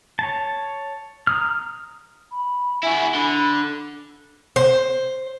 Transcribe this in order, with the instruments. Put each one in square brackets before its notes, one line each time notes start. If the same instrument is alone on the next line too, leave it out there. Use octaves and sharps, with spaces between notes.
[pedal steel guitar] C#5 A5
A#5 D#6 F6
[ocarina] B5
[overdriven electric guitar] E4 F#4 [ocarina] G#5
[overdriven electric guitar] D3 [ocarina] B5
[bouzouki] C5